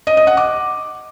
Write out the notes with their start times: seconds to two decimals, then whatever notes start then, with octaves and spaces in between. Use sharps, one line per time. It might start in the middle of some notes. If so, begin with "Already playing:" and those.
0.07 D#5
0.17 D#5
0.27 F#5
0.37 D6